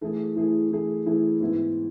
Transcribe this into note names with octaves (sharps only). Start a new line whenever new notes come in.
E3 A3 E4 G#4
E3 A3 E4 G#4
E3 A3 E4 G#4
E3 A3 E4 G#4
G#2 E3 B3 E4